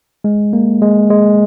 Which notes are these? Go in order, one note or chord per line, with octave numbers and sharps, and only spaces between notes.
G#3
A#3
G#3
G#3